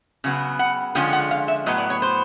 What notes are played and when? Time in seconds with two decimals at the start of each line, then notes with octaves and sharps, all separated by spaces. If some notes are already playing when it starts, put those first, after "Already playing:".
0.24 C#3 F#3 B3
0.59 F#5
0.95 D3 F3 G#3 C#4 F4 G5
1.13 F#5
1.31 F5
1.48 E5
1.66 A2 F#3 B3 D#5
1.78 D5
1.90 C#5
2.02 C5